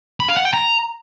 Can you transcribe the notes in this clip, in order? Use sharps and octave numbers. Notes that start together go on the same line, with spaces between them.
B5
F5
F#5
G5
A#5